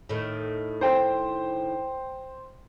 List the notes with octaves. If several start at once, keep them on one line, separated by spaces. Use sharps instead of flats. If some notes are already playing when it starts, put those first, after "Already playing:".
A2 D#3
C5 G5